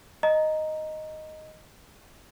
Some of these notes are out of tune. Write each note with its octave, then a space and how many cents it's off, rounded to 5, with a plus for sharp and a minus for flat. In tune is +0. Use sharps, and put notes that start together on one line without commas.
D#5 +0 A#5 +0